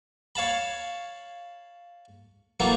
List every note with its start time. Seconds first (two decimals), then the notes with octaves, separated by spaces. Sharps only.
0.35 C#5 F5 A5 B5
2.60 E3 F#3 A3 A#3 F4